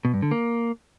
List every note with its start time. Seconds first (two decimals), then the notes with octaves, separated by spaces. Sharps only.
0.05 B2
0.14 G2
0.22 D3
0.31 A#3